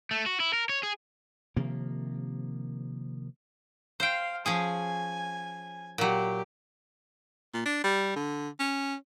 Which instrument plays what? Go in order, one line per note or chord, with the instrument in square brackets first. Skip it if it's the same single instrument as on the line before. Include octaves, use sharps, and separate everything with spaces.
[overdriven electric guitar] A3
F#4
E4
A#4
C#5
G#4
[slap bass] C3 D#3 F3 A#3
[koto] C5 G5 [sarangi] F5
[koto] F3 C#4 G#4 [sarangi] G#5
[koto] A#2 F#3 [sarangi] G4
[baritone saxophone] A#2
D4
G3
D3
C#4